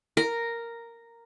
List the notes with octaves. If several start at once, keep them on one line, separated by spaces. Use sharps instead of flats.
A#4